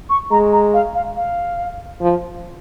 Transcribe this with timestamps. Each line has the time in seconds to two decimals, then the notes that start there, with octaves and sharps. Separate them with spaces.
0.10 C#6
0.31 G#3 A#5
0.52 A#5
0.74 F5
0.95 F5
1.16 F5
2.01 F3